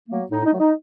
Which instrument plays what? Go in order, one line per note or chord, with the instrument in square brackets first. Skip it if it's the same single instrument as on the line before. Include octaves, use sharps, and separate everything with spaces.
[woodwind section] F#3 A3 A#3
A2 D#4
D#4
F#3 A3
D#4